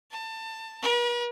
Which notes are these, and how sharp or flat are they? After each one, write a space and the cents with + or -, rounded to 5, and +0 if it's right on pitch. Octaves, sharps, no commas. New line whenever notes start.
A5 +25
B4 -45